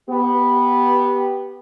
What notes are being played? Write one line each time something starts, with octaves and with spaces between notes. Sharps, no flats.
B3 G4